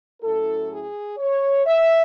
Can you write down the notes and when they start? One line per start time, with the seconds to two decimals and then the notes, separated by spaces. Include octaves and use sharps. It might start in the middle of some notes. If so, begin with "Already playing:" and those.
0.22 A2 F#3 C#4 E4 A4
0.71 G#4
1.18 C#5
1.66 E5